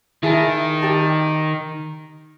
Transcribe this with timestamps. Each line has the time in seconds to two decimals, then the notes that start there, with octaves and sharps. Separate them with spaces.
0.23 D#3 E4 G#4 A5
0.82 G4 A5